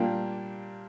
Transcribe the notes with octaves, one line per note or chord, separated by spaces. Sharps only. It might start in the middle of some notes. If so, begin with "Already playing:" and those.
Already playing: A#2 G3 A#3 D4 G4